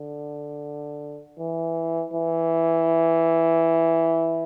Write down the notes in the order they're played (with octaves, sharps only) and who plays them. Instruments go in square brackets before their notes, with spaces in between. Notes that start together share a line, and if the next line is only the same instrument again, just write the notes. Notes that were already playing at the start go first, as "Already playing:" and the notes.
Already playing: [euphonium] D3
E3
E3